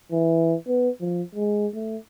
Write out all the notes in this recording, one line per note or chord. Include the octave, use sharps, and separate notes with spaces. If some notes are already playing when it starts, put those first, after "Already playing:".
E3
B3
F3
G#3
A3